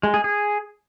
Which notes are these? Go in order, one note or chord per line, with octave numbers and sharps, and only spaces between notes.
G#3
G#4
G#4